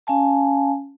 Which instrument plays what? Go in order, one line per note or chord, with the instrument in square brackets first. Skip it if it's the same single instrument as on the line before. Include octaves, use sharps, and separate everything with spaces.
[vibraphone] C#4 F5 G#5 A5